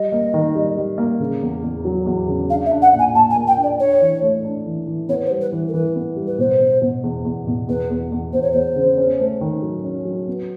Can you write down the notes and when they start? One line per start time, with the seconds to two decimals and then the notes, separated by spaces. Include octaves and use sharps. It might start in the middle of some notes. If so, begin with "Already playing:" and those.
Already playing: G3 D#5
0.12 A#3
0.34 D#3
0.55 G3
0.77 G3
0.98 A#3
1.20 C#3
1.42 E2
1.63 E2
1.85 F#3
2.06 E2
2.28 C#3
2.50 D4 F5
2.66 E5
2.71 D4
2.82 F#5
2.93 A#2
2.99 G#5
3.14 A#2 A5
3.30 G#5
3.36 A#3
3.47 G5
3.57 D4
3.63 D5
3.79 D4 C#5
4.01 E3
4.22 A3
4.45 D4
4.66 E3
4.87 E3
5.09 B3 C#5
5.25 C5
5.31 G3
5.41 B4
5.52 E3
5.68 A#4
5.73 E3 B4
5.96 B3
6.16 G3
6.27 B4
6.38 B2 C5
6.60 B2
6.82 B2
7.04 E2
7.25 E2
7.47 B2
7.68 E2 B4
7.90 E2
8.12 E2
8.33 E2 C5
8.42 C#5
8.52 E2 C5
8.76 C#3
8.98 C#4
9.19 A3
9.41 D#3
9.62 F#3
9.84 C#4
10.05 F#3
10.28 B3